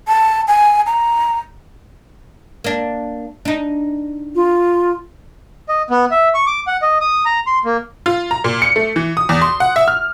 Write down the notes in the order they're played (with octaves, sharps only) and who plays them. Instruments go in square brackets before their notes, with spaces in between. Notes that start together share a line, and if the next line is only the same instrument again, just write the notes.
[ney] A5
G#5
A#5
[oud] A#3 D4
D4 D#4
[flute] F4
[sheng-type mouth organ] D#5
B3
E5
C#6
D6
F#5
D#5
D#6
A#5
C6
A#3
[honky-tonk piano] F4
A#5
A#2
C#7
A3
E3
D#6
E2
C6
F#5
E5
F6